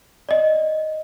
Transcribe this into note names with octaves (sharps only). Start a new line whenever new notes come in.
D5 D#5